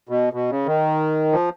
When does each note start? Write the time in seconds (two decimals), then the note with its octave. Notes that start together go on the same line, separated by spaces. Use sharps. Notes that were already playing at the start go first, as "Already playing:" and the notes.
0.09 B2
0.33 B2
0.50 C#3
0.66 D#3
1.32 F3